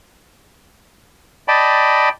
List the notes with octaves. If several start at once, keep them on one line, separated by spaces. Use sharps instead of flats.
D5 D#5 G5 A5 B5